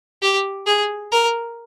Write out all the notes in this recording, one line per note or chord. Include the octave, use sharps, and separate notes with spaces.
G4
G#4
A#4